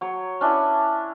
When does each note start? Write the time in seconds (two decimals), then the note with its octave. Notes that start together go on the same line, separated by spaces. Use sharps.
0.01 F#3 C#5
0.41 C#4 D4 E4 B4